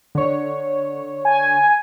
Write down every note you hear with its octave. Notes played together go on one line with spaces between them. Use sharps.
D3 C#5
G#5